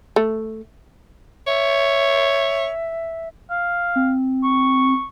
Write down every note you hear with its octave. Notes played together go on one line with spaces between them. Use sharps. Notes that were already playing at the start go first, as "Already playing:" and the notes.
A3
C#5 E5
F5
C4
C#6